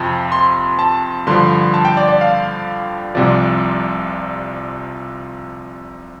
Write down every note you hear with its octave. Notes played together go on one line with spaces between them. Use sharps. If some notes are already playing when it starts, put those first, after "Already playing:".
Already playing: F2 C3 F3
C6
A5
G2 D3 F3 C6
A5
G5
D5
D5
F5
C2 C3 F3 D5